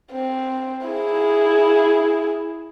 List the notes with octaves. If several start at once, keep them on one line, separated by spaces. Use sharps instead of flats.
C4
E4 G#4